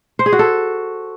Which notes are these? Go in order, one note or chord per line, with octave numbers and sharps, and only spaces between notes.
C5
G#4
F#4
A4